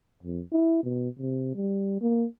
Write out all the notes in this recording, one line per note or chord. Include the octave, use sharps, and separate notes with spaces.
F2
E4
B2
C3
G3
A#3